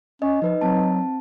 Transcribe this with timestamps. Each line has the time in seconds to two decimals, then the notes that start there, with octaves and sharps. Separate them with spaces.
0.22 C#4 D#5
0.42 F3 D#4 B4 D#5
0.61 F#3 C4 A5